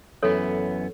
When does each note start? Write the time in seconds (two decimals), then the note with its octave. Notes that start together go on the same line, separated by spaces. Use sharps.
0.23 F#2 E3 B3 A4 C#5